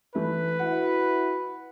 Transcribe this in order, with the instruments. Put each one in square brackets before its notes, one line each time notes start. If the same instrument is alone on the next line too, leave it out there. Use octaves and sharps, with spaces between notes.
[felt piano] E3 A3 E4 [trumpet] B4
[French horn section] E4 F#4 [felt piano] F#5